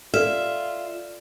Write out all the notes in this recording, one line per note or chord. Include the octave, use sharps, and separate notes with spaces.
F4 A4 D5 E5 F6